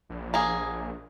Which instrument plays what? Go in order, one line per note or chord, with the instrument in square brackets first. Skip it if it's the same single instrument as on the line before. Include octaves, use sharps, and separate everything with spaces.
[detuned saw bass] A#1
[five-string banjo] A#3 G#4